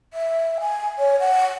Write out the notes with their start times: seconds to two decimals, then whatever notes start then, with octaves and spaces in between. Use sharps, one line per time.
0.13 E5
0.60 G#5
0.98 C#5
1.20 F#5